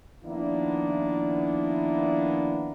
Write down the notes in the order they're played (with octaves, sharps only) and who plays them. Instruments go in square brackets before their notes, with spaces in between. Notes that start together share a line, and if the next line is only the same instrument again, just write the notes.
[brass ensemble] D#3 F3 A#3 B3 D4 E4